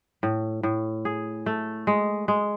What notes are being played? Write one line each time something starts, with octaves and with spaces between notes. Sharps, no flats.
A2
A2
G#4
A3
G#3
G#3